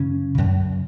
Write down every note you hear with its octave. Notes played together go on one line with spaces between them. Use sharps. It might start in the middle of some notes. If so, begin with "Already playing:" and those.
Already playing: F#2 C#3 C#4
F#2 C#3